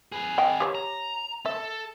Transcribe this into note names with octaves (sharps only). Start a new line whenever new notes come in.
G#4 B4
D#5 G5
G4 C#5
A#5
A4 E5